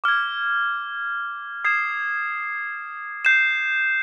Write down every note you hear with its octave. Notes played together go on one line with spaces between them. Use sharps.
D6 F6 G#6
D#6 G#6 C7 E7
G6 C7 E7